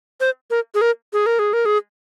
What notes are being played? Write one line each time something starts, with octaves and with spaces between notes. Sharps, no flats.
C5
A#4
G#4
A#4
G#4
A#4
G#4
A#4
G#4